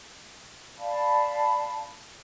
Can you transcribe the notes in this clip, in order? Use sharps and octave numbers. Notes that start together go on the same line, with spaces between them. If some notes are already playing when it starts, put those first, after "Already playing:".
D5 F5 A5 B5